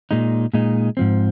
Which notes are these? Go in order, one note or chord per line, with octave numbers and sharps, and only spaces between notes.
A#2 G#3 D#4
A#2 G#3 D#4
G#2 F3 C4